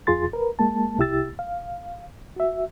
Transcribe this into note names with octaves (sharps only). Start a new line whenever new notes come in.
F2 F4 G#4 C6 A6
A#4 B4
G#3 A#3 A5
C2 E4 G4 E6 A6
F5
F#4 E5